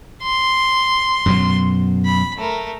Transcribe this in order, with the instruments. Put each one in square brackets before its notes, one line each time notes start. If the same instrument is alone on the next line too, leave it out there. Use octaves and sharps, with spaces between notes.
[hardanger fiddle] C6
[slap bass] F#2 B2 F#3
[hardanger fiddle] B5
A3 A#4